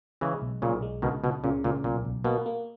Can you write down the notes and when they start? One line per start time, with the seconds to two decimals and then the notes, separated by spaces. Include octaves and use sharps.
0.21 C#3 E3 G#3
0.42 B1
0.62 B1 A#2 C#3
0.82 G#3
1.02 C#2 B2 D#3
1.24 C#2 B2
1.44 A#2 C#3
1.64 C#2 A#2
1.84 B1 A#2
2.05 B1
2.24 B2 A#3
2.46 A#3